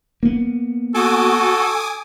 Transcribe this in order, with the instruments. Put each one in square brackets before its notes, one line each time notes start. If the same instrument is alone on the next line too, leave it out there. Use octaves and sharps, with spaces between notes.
[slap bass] A#3 B3
[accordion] F#4 [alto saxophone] A4 [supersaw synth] G#5 D6 D#6